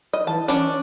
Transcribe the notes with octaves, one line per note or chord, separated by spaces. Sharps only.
D#5
E3 A5
C#4 D4 D5